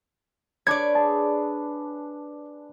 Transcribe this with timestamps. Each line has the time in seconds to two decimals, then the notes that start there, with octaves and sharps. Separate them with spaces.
0.67 D4 B4 C#5 D5 G#6
0.95 G#4 A5